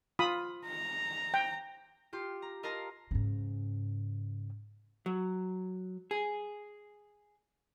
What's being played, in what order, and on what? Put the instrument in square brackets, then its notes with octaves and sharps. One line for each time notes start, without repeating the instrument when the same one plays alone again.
[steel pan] F4 B5 D#6
[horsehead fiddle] A#5
[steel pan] G5
[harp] F4 G4 C6
A#5
A#4 D#5 F5 A5 A#5 C6
[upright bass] G#2 C#3
[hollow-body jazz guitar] F#3
G#4